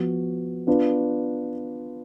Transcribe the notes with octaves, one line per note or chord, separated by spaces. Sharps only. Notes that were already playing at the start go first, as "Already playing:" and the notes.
Already playing: F3 B3 F#4
B3 D4 F4 B4